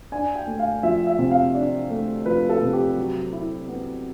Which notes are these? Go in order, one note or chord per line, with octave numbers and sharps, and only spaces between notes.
D4 G#5
G5
A3
F5
F3 E5
E5
C3
F5
D4
A3
F3 B4
A4
C3
G4
F#3
E4
B3